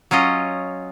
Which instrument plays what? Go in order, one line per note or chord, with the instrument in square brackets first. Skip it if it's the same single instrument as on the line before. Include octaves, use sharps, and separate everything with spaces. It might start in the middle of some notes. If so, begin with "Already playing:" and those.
[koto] F#3 C#4 F4 D#5